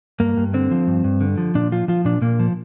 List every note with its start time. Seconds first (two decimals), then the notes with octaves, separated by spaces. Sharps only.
0.20 G2 A#3
0.37 G2
0.54 D3 C4
0.71 F3
0.87 G2
1.04 G2
1.21 D3
1.37 F3
1.55 A#2 D4
1.72 F3 F4
1.88 F3 F4
2.05 A#2 D4
2.22 A#2 A#3
2.40 F3